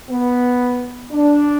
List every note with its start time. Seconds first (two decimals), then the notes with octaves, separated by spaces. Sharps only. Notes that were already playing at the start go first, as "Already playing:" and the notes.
0.10 B3
1.12 D4